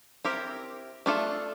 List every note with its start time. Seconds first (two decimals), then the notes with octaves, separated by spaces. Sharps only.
0.25 C4 E4 G4 A#4
1.06 A3 D4 F4 A4